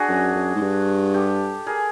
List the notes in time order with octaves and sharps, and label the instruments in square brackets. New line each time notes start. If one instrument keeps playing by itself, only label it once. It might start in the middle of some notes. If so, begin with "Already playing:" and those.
Already playing: [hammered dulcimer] D4 F#4 G#4
[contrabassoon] F#2
F#2
G#2
G2
[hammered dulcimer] G4 A4
G#4 A#4